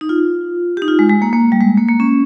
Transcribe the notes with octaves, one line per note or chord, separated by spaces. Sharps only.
D#4
F4
D#4 G4
F4
G#3
G#3
A#3
A#3
G3
G#3
A#3
A#3
C#4